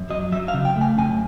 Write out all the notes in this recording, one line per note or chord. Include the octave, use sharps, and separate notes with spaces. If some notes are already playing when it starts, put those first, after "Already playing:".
Already playing: F#2
F#3 D#5
F#3 E5
F5
C#3
G5
A3
G#5
F#2 G#5